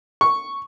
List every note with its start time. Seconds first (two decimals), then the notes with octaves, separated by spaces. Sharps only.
0.21 C#6